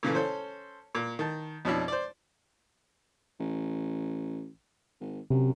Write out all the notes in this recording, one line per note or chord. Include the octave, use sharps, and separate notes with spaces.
A#2 C#3 E3 A3
C#4 A4 C5
A#2
D#3 A5
F2 B2 C#4 D4 E4
C5 D5
A1
G#1
F#2 C3